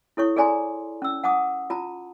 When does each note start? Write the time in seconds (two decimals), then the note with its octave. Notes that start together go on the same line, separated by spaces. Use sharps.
0.17 E4 A4 C#5 C#6
0.36 G#4 A4 D5 G#5 A#5 C6
1.02 C#4 E6
1.24 F#5 A5 D6 D#6
1.70 F4 A5 A#5